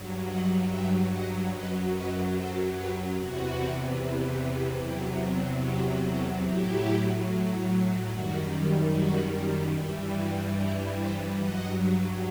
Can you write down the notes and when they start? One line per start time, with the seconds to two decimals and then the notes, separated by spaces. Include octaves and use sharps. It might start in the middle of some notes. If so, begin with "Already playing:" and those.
Already playing: G2 F#3
0.28 D#5 F#5
0.69 E5 G5
1.10 D#5 F#5
1.51 F#2 F#3 B4 D#5
1.92 B4 D#5
2.34 A4 C5
2.74 G4 B4
3.16 E2 C3 E3 F#4
4.81 E2 C3 F#3 E4 G4
5.63 E4 G4
6.04 F#4 A4
6.45 A2 F#3 E4 G4
8.10 F#2 D#3 G3 F#4
8.92 F#4
9.75 G2 E3 G3 E4
10.15 F#4
10.56 E4 G4
10.98 C5 E5
11.39 G2 F#3 D#5 F#5